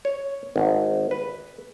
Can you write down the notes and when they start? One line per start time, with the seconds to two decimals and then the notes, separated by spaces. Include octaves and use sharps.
0.05 C#5
0.56 G#1
1.11 B4